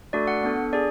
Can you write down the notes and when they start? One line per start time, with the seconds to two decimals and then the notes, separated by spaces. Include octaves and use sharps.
0.13 A3 D4 F#4 A4 D5
0.27 F#5
0.43 B3 D4 A4
0.73 D4 G#4 D5